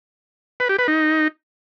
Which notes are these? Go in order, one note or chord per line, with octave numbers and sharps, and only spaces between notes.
B4
G4
B4
D#4